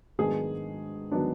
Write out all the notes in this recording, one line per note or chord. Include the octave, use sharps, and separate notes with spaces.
G#2 D#3 F#3 B3 D4 G#4
D#3 F#3 B3 D4